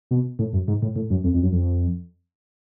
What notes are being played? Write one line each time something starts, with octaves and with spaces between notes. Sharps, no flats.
B2
A2
F#2
G#2
A2
A2
F#2
F2
F2
F#2
F2